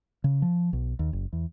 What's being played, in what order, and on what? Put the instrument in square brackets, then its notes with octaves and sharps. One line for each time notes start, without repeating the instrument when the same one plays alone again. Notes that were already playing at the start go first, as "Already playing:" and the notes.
[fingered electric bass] C#3
F3
B1
D#2
F#1
E2